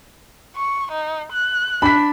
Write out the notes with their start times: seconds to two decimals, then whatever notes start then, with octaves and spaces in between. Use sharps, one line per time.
0.57 C#6
0.92 D#4
1.32 F#6
1.82 D4 B5 B6